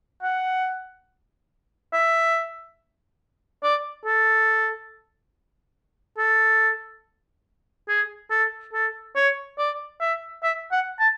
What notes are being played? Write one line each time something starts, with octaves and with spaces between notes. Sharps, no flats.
F#5
E5
D5
A4
A4
G#4
A4
A4
C#5
D5
E5
E5
F#5
A5